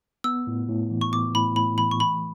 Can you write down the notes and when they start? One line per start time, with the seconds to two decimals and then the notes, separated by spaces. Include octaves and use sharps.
0.24 B3 E6
0.47 A2
0.69 A2
0.91 E3
1.01 C#6
1.12 B3 D6
1.35 A2 B5
1.56 A2 B5
1.78 E3 B5
1.91 C#6
2.00 A3 B5